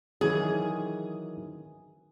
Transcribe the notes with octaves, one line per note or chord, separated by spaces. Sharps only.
D#3 E3 F#3 G#4